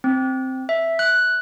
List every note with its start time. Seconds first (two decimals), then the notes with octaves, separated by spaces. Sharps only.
0.04 C4
0.69 E5
0.99 F#6